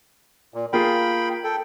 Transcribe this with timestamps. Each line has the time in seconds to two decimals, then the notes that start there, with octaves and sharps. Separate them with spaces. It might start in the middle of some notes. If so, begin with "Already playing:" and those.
0.54 A#2
0.73 A#3 F4 G#4 G5 B5
1.44 A4 G5